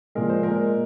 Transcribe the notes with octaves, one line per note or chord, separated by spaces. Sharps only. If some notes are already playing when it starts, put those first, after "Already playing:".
A#2 F3 G#3 A#4
C5
A#2 G#3 A#4